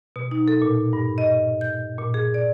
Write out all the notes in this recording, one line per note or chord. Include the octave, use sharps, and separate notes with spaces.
B2
D#4
A4
A#2
G2
D#5
G6
A#2
G#4
D5